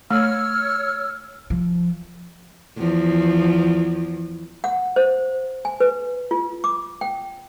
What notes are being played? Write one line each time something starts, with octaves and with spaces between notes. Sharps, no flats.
A3 C#5 E6 F6
F3
E2 F3
F#5
C5
G#5
B4
F4
D6
G5